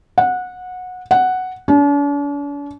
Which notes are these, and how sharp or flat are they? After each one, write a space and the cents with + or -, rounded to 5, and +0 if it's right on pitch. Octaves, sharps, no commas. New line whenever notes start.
F#5 -20
F#5 +0
D4 -45